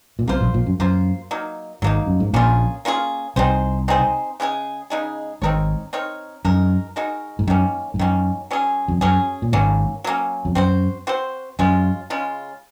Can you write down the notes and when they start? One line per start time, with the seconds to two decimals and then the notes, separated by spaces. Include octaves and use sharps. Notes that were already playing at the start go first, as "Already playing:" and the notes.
0.19 A#2
0.28 C2 C3 A#3 F4 C5
0.41 A#1 A#2
0.54 A#1 A#2
0.66 F#2
0.80 F#2 A#3 F4 C5
1.31 F#3 A#3 D#4
1.82 G#1 G#2 F#3 A#3 D#4
2.06 F#2
2.20 G#2
2.33 A#1 A#2 A#3 C#4 F4 G#4
2.85 A#3 C#4 F4 G#4
3.36 C2 C3 C4 D#4 G#4 C5
3.88 C4 D#4 G#4 C5
4.40 C#3 G#3 D#4 G#4
4.90 C#3 G#3 D#4 G#4
5.42 G#1 G#2 C4 D#4 A#4 C#5
5.93 C4 D#4 A#4 C#5
6.45 F#2 G#3 D#4 F#4 A#4
6.96 G#3 D#4 F#4 A#4
7.39 G#2
7.47 F#2 D#3 A#3 C#4
7.94 G#2
7.99 F#2 D#3 A#3 C#4
8.51 F#3 C#4 G#4
8.88 F2
9.01 F#2 F#3 C#4 G#4
9.42 A#2
9.52 G#1 G#2 F#3 A#3 C#4
10.04 F#3 A#3 C#4
10.45 F2
10.55 F#2 C4 F#4 C5
11.07 C4 F#4 C5
11.59 F#2 C#3 G#3 C#4 F4
12.10 C#3 G#3 C#4 F4